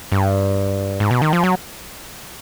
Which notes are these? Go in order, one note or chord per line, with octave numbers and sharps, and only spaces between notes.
G2
G#2
B2
D#3
F3
F#3